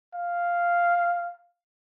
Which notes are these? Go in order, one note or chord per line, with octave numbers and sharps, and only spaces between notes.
F5